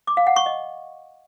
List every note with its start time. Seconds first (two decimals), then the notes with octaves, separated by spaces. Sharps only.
0.07 D6
0.17 F5
0.27 F#5
0.36 C#6
0.46 D#5